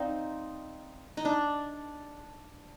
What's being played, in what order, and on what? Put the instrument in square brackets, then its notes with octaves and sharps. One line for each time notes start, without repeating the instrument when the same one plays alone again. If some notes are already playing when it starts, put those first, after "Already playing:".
Already playing: [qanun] C4 D#4 [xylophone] D5 F5
[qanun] D#4
D4